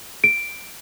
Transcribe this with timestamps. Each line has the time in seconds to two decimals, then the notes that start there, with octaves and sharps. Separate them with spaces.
0.24 D7